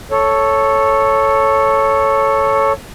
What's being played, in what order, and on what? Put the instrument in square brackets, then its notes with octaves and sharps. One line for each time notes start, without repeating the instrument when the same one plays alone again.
[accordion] A4 C#5